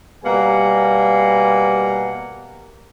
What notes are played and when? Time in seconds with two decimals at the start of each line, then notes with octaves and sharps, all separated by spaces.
0.25 B2 G3 A#3 F#5 G#5 A#5